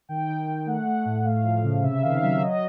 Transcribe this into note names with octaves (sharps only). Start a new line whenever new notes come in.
D#3 G5
D#3
D#3
A3 F#5
A3
A2
A3 F5
F3
C#3
C3 E5
D#3 F5
F#3 E5
F#3 D#5